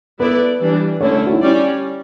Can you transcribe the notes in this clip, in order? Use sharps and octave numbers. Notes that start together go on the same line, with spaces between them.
B3 E4 A4 B4 D5
E3 G3 D4
D3 A3 C#4 E4 C#5
C#5
F#4
E4
G3 C#4 G4 D5